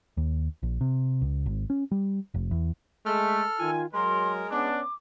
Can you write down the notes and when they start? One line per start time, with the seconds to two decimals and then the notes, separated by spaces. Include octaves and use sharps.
0.17 D#2
0.63 A#1
0.81 C3
1.22 C#2
1.46 G#1
1.70 C#4
1.92 G3
2.34 F1
2.51 E2
3.06 G#3 A3 A4 F6
3.59 D#3 F4 G#5
3.93 F#3 G#3 A#4 C6
4.51 B3 C#4 D4 D6